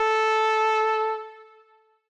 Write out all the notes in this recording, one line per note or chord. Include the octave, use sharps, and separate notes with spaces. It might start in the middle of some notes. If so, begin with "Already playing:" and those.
Already playing: A4